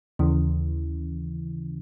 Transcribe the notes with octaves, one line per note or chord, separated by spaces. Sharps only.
D#2 C#3 E3